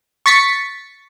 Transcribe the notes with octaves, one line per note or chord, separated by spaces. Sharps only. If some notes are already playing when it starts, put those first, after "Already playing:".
C#6 A6 B6 C#7